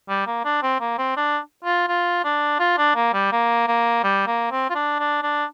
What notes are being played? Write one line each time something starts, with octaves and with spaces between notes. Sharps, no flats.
G3
A#3
D4
C4
A#3
C4
D4
F4
F4
D4
F4
D4
A#3
G3
A#3
A#3
G3
A#3
C4
F4
D4
D4
D4